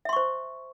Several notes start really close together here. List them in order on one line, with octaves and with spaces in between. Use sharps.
E5 C6 C#6 C5